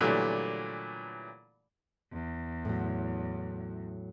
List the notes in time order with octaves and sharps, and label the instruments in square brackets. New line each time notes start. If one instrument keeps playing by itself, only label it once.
[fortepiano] A#2 D3 E3 F#3 G3 A3
[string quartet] E2
[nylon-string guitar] A2 F#3